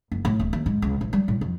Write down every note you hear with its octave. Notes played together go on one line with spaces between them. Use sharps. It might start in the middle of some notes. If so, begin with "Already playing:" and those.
F#1
A2
D#1
D#2
G#2
C#2
A1
G3
A2
F2